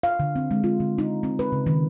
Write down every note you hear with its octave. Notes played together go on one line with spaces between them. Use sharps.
F5
D3
C4
G#3
F4
D3
D#4
C4
B4
C#3
D#3